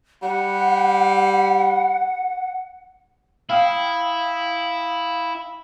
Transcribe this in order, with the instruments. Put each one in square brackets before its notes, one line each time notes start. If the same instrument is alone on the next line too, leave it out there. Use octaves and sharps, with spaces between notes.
[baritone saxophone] G3 [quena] F#5
[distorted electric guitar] E4 [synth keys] F5 G5 D#6